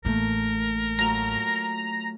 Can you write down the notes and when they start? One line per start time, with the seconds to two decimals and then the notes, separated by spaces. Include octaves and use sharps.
0.05 A1 A2 A3 A#3 A#4
0.99 F#3 A3 F4 A#5